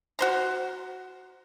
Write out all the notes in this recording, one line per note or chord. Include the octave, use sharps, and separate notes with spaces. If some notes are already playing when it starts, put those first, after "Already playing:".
F#4 C5 A#5